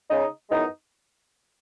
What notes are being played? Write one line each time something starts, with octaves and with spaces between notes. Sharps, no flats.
C#3 G#3 D#4
F#2 E3 G#3 B3 D#4